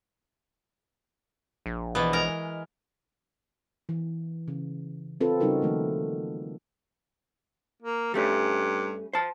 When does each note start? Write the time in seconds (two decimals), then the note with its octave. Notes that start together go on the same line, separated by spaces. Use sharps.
1.66 A#1
1.95 B2 E3 B3
2.13 G#3 A#4 A#5
3.89 E3
4.48 C#3
5.21 C4 F4 A4 B4
5.40 C#3 G3 D#4 F#4 A#4
5.62 D#3 F3 A3 A#3
7.82 A#3
8.14 G2 G3 A3 C#4
9.13 C5 A5